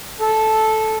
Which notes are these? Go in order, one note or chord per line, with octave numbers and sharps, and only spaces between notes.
A4